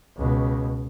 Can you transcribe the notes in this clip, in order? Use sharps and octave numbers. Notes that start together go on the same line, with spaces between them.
C#2 B2